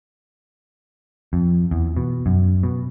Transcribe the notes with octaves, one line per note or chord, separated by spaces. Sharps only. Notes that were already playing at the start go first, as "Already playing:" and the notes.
F2
E2
B2
F#2
B2